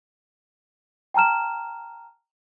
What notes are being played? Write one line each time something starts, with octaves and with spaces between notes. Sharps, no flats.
G5 A5 A#5 F6 E7